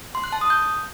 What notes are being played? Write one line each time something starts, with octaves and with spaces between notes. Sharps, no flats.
C6
F#6
A5
D#6
G6